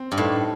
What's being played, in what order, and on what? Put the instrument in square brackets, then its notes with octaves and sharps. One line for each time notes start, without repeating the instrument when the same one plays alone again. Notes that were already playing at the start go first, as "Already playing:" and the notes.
Already playing: [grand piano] C4
[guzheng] G2
[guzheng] A2 [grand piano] D#4